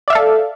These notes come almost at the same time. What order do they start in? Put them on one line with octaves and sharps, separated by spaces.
D5 E5 F5 A4